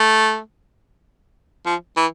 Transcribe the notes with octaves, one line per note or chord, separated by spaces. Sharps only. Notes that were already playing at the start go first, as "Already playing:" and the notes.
Already playing: A3
F3
E3